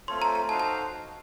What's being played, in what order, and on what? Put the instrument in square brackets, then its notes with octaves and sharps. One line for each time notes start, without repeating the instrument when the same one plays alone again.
[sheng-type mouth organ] A3 C4 F4 A4 C#5 [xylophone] C6
[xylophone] A#5
A#5
[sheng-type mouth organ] D#4 F#4 A4 C5 F5 [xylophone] A5
[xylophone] A5